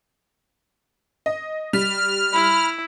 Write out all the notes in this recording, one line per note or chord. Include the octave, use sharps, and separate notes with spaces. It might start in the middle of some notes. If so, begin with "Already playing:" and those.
D#5
G3 F6 B6
E4 B5